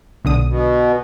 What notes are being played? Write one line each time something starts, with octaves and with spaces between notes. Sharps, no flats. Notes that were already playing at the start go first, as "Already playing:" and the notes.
B1 D3 D#6
B2